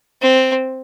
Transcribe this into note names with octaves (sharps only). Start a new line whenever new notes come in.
C4